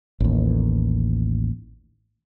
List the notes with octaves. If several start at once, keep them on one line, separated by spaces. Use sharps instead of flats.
A1 D#2